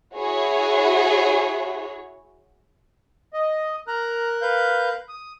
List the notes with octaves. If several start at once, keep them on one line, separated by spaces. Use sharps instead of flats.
E4 F#4 G#4 C#5
D#5
A#4 A#5 F#6
B4 F5 G6
D#6